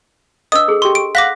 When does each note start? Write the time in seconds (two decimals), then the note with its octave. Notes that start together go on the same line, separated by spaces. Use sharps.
0.52 D4 B4 D#5 D#6 E6
0.68 G#4 A4
0.82 G4 C6 C#6
0.95 D7
1.15 F5 F#5 D6 F#6 A#6 B6